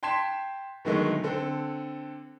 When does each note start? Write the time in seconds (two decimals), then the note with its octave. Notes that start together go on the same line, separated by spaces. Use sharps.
0.03 G5 A5 C6 G#6 B6 E7
0.85 B2 D3 D#3 F#3 G#3 A3
1.24 D3 C4 A4